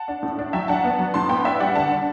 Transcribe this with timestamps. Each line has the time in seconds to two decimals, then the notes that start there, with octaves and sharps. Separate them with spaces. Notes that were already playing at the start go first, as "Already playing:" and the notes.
Already playing: F#5 A5
0.08 D4
0.23 A2
0.39 D4
0.53 F#3 E5 G5
0.68 D4 F#5 A5
0.84 B3
0.99 F#3
1.14 A2 A5 C6
1.29 B3 G5 B5
1.45 D4 E5 G5
1.60 G3 D5 F#5
1.75 D3 F#5 A5
1.91 D4